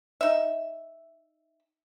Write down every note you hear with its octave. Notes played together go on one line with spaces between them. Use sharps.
D#4 E5